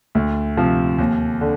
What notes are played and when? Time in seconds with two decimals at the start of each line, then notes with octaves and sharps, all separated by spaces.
0.15 D2
0.57 C3 F3
0.99 D#2
1.41 D3